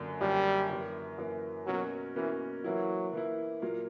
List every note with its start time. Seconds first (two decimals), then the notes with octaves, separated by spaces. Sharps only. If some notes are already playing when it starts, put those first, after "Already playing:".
Already playing: F#2 D3 A#3
0.21 F#2 D3 G3 A#3
0.69 F#2 E3 A#3
1.18 F#2 E3 A#3
1.66 B2 F#3 A#3 C#4 F#4 A#4
2.16 B2 E3 A#3 C#4 F#4 A#4
2.64 E3 F#3 A#3 E4
3.13 E3 A#3 E4
3.62 A#2 F#3 A#3